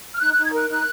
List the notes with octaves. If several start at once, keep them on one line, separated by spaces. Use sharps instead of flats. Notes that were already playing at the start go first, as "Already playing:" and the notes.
F6
D#4 F#6
D#4 F#6
G#6
A#4 F#6
D#4 F#6